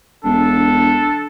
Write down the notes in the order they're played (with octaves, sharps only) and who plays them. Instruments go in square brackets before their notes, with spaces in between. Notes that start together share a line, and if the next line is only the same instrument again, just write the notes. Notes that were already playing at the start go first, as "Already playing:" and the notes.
[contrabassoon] E1 [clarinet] D4 [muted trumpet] A4